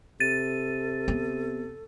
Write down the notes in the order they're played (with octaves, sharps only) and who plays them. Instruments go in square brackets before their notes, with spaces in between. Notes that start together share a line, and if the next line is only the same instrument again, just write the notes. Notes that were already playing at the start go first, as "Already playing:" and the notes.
[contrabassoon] C3 [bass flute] A4 [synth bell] A6 D#7
[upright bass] B3